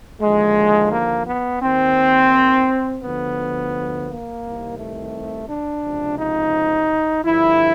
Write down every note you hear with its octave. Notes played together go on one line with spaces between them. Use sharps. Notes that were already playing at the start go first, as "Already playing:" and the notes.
D#2 D3 F3 G#3
A#3
B3
D#2 D#3 C4
D2 D3 F3 B3
A#3
C2 C3 D#3
A3
D4
C#2 C3 F3
D#4
G2 D3 F3 E4